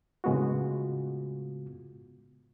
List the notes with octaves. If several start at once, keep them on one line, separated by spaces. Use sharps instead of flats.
A2 C#3 G#3 B3 F4 F#4